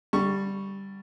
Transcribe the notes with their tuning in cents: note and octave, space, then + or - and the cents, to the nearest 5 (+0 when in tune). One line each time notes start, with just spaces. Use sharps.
D3 -10 G3 +0 C#6 +0